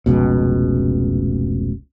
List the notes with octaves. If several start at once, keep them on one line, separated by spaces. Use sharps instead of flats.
F1 C#2 B2